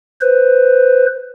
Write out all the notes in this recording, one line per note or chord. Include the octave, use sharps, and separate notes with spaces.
B4 C5